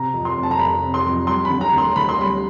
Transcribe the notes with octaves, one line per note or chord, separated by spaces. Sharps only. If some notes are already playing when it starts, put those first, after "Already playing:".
Already playing: C3 A#5
F2
C6
F1
A5
A#5
F1 B5
C3
C6
F2
G3 C6
B5
D3
A#5
D2
C6
D2 B5
C6
G3 B5